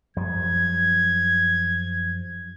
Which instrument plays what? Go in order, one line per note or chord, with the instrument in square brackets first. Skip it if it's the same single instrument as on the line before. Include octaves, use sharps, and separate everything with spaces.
[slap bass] F#2 F3 G3 [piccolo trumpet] G#6